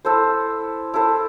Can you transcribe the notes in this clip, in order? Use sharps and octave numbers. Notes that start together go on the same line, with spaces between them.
E4 A4 C5
E4 A4 C5